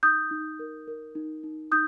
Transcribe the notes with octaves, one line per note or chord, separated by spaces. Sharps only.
D#4 D#6 G6
D#4
A#4
A#4
D#4
D#4
D#4 D#6 G6